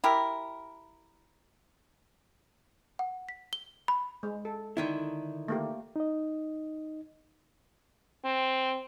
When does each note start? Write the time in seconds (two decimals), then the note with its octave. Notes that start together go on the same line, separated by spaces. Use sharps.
0.04 E4 G4 A#4
2.99 F#5
3.29 B6
3.53 G7
3.88 B5
4.23 G#3
4.45 A4
4.77 D3 D#3 E4
5.48 A3 A#3 G4
5.96 D#4 D#5
8.25 C4